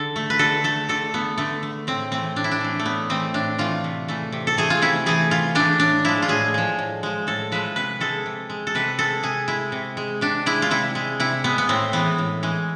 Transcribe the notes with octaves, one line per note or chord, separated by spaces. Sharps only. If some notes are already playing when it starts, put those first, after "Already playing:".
Already playing: D3 A4
A3
B4
D3 A4
A3 A4
D3 A4
A3 B3
D3 A3
A3
A2 C4
E3 A3 C4
A2 D4
E4
D4
E3 A3
A3
A2 B3
E3 A3 C4
A2 D4
E3 A3 F4
C3
E3 A3
C3
A4
E3 A3 G#4
F4
C3 E4
E3 A3 G#4
C3 F4
E3 A3 D4
A2 D4
F3 G#3 E4
F4
A2 G#4
F3 G#3
A2
F3 G#3
A2 A4
F3 G#3 B4
C3 B4
G#3 A4
C3
G#3
A4
C3 B4
G#3 A4
C3 G#4
G#3 E4
C3
G#3
C3 D4
G#3 E4
F4
C3 E4
G#3
C3 E4
G#3 B3
B3
A2 C4
E3 G#3 B3
A2
E3 G#3